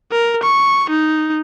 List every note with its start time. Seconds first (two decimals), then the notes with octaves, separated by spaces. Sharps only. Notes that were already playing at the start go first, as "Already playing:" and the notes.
0.12 A#4
0.44 C#6
0.90 D#4